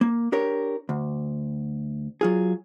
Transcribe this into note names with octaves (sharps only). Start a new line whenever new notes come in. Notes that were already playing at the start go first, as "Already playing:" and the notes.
A#3
D4 G4 A#4 C#5
D2
F#3 F4 G#4